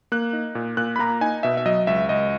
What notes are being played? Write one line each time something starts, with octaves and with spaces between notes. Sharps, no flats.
A#3 F#6
D#4
A#2
A#2 F#6
B5
A#3 A#5
D#4 G#5
B2 E5
E5
F#3 D#5
C#2 E5
C#2 D#5